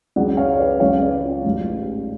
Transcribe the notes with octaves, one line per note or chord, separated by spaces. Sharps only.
C#2 C#3 F#3 D5 F#5
C#5 F5
C#5
B4 D5
C#2 C#3 F#3 C#5 F5
B4 D5
C#4 F4
A1 G#2 F#3